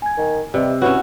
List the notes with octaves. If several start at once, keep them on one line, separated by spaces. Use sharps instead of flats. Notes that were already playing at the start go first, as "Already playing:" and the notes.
G#5 G#6
D#3
C3 G3 B4 D#5 E5
C#4 E4 F#4 B4 C#5